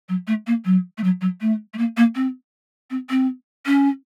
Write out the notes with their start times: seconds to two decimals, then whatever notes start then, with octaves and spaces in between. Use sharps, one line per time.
0.09 F#3
0.27 A3
0.47 A#3
0.65 F#3
0.98 A3
1.03 F#3
1.21 F#3
1.41 A3
1.73 A3
1.78 A#3
1.97 A#3
2.15 C4
2.90 C4
3.10 C4
3.66 C#4